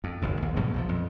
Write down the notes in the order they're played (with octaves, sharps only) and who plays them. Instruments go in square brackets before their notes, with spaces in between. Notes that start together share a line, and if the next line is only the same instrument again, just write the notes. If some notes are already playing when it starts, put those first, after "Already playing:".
[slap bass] F2
F#1 D#2 G#2
A#1 D#2
G#2 B2 F#3 G3
A#1 E2 F3
F2